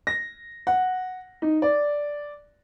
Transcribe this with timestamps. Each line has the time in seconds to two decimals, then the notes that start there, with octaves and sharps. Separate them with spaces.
0.07 A#6
0.67 F#5
1.42 D#4
1.62 D5